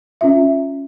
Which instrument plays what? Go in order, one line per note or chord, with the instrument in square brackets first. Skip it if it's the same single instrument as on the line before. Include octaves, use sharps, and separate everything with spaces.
[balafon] C#4 F4 E5